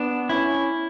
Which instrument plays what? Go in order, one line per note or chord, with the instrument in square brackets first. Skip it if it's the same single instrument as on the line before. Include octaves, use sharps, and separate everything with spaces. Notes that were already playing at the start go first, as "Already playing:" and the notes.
Already playing: [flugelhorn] B3 [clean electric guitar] D4
[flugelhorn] C#4 [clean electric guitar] E4